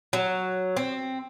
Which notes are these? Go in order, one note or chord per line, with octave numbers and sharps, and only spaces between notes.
F#3
C4